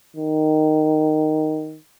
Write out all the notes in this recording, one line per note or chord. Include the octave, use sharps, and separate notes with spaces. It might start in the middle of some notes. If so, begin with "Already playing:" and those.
D#3